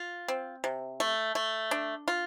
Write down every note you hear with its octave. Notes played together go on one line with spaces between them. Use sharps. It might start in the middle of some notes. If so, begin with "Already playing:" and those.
Already playing: F4
C4
C3
A3
A3
D4
F4